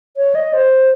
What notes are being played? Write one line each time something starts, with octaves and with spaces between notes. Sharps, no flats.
C#5
D#5
C5